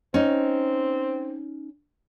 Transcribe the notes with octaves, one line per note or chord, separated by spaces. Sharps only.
C4 C#4 D#4